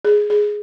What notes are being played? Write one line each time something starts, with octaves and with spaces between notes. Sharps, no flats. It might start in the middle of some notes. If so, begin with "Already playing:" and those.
G#4
G#4